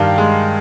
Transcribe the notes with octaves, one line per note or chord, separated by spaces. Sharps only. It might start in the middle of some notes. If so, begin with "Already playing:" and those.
Already playing: G2 D#3 F5 G5
G#3